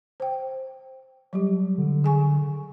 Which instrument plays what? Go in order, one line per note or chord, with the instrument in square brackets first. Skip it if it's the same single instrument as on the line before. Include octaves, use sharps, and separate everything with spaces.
[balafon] C5 G5
F#3 G3 G4
[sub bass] D3
[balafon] G#4 G#5 C#6